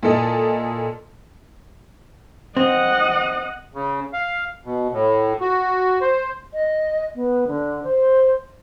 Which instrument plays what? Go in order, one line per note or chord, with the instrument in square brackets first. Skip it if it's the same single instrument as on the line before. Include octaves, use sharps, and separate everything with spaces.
[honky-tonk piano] A#2 E4 A4 D#5
[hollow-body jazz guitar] C4 [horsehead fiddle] D#5 F#5
[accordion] C#3
F5
B2
A2
F#4
C5
[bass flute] D#5
B3
D3
C5